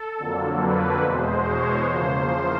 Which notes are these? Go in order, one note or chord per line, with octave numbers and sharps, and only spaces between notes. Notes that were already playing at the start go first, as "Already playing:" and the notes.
Already playing: A4
F2 D3 F#3 A#3
B4
E2 B2 G#3 C5
C#5
E2 C#3 F3 A#3 C5